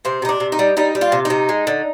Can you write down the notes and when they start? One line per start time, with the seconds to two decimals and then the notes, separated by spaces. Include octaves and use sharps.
0.05 C3 C4
0.22 C3 D#4
0.29 D4
0.40 C3
0.52 D#4
0.59 G3
0.77 G3 D#4
0.95 G3
1.01 F4
1.12 C3
1.25 C3 D#4
1.49 G#3
1.67 D3